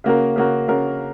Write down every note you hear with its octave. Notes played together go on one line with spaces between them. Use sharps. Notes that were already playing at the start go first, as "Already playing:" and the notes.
C#3 A#3 F#4 A#4
C#3 A#3 F#4 A#4
C#3 A#3 F#4 A#4